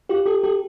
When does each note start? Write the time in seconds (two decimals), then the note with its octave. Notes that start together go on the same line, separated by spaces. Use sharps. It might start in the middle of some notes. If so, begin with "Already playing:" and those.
0.09 F4 G4
0.26 G4 A4
0.43 G4 A4